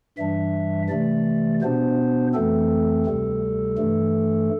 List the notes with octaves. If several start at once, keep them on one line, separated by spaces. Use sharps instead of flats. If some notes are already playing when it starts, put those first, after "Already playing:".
G2 E3 G3 D4 E5
C3 E3 A3 D5
B2 B3 D4 C5
F2 E3 A3 C4 A4
D2 C3 G3
G2 E3 A3